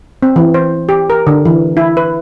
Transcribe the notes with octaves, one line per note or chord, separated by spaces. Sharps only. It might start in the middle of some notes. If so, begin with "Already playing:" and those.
C4
E3
C5
G4
A#4
D3
E3
E4
B4